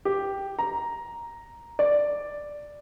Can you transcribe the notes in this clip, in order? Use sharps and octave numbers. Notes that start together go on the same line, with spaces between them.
G4
A#5
D5